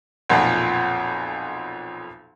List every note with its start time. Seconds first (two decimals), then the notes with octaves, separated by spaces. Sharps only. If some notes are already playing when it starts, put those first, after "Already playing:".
0.30 B1 F2 A#2